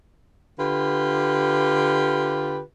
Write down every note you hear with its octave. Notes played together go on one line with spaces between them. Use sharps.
D3 F4 G4 B4